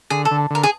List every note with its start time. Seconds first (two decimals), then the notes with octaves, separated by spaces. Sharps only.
0.10 D3 G#4
0.25 A4
0.31 D3
0.50 D3 A#4
0.63 G#4